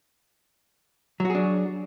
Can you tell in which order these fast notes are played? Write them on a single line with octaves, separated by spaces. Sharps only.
F#3 F#4 G#4 D4